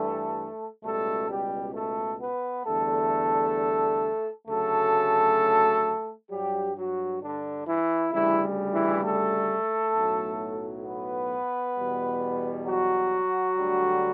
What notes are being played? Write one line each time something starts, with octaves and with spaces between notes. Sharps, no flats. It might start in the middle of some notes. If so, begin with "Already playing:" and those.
Already playing: G2 E3 G3 A3 A4
C#2 B2 G3 A3 A4
G3 G4
A3 A4
B3 B4
E2 D3 G3 A3 A4
D2 C#3 F#3 A3 A4
G2 F#3 G3 G4
F#3 F#4
D3 D4
E3 E4
D2 C#3 E3 G3 E4
E3 E4
A3 A4
B1 A2 F#3
B3 B4
E2 B2 G3
F#3 F#4
D2 D3 G3